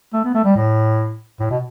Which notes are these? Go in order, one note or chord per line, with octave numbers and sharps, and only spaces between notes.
A3
B3
A3
G3
A2
A2
B2